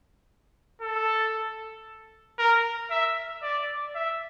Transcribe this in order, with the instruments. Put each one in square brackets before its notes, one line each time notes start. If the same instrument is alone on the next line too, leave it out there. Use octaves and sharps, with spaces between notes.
[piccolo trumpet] A4
A#4
E5
D5
E5